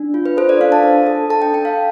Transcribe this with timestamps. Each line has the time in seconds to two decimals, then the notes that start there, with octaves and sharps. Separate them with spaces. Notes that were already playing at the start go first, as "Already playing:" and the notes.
Already playing: D4
0.14 F4
0.26 B4
0.37 A4 C5
0.49 D5
0.61 D4 F5
0.72 A5
0.83 D4
1.07 A4
1.30 A4 A5
1.42 G5
1.53 D4 G5
1.65 F5